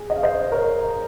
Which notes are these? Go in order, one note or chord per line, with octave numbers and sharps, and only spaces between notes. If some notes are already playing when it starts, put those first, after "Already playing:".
Already playing: G#4
D#5
F5
C5 D#5
A#4 C#5